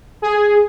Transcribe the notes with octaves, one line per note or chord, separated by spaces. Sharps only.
G#4